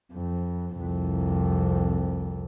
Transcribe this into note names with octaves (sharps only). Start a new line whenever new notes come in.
F2
C2 F2